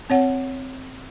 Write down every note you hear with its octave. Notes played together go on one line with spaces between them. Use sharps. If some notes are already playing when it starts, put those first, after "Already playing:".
C4 C#5 F#5